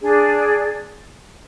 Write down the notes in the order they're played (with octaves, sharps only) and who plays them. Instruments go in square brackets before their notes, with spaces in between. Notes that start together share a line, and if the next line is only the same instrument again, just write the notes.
[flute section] D4 G#4 D5